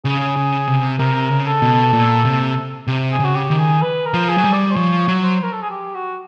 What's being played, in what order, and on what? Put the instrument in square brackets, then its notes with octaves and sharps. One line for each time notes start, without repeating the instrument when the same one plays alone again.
[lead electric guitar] C#3 [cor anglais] G#4
[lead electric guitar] C#3
C3
[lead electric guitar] C3 [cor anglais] A#4
[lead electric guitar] C#3
[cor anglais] A4
[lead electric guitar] B2
A#2
C3
C3
[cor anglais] G#4
[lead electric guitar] C#3 [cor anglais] F#4
[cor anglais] G4
[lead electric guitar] D#3
[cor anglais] G#4
B4
A#4
[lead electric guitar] F3
[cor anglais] G#4
[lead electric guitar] F#3
G3
[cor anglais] D5
C5
[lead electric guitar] F3 [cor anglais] C#5
[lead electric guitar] F#3
[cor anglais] C5
A#4
A4
G#4
G4
F#4